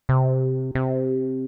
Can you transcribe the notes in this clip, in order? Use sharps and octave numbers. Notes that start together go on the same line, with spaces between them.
C3
C3